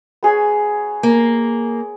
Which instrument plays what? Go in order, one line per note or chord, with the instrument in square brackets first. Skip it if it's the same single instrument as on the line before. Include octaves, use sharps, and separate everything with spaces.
[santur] B3 G#4 C#5
[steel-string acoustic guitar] A#3